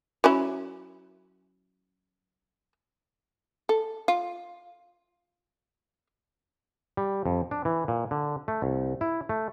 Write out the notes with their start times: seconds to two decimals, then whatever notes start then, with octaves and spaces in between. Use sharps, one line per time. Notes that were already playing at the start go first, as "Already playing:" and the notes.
0.24 F#3 C#4 E4
3.69 A4
4.08 F4
6.97 G3
7.26 F2
7.51 D4
7.65 E3
7.88 A#2
8.11 D3
8.48 A3
8.62 C2
9.01 E4
9.29 A3